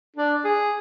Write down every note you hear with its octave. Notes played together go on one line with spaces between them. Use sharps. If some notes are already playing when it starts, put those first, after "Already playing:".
D4
G#4